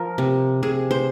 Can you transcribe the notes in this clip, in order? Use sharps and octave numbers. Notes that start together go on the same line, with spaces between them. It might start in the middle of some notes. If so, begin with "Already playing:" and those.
Already playing: F3 A#4
C3
C3 G#4
C5